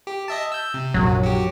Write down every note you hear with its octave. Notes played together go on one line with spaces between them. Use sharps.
G4
D#5 E5 A5
E6 G6
C3
A#1 F#2 F#3
F#4 G4